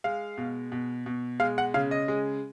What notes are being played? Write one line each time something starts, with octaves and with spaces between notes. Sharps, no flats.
G#3 F5
B2
B2
B2
G#3 F5
F#5
C#3 F5
D#5
G#3